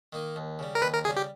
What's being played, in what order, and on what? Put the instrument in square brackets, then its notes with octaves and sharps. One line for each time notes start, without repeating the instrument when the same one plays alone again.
[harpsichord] D#3 A#3 D#4
D#2
C#3 G3
[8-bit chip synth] A#4
[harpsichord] D#2 [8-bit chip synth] B4
[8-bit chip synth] A#4
[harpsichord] C#3 [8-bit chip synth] G#4
[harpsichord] G3
[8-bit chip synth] G4